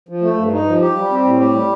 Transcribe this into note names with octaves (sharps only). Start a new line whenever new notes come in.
F3
A3
G2
D#4
F3
G4
G3
C4
A2
G4
G3